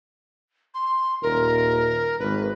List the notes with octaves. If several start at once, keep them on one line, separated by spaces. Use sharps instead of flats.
C6
D#1 A#4
G#1 B4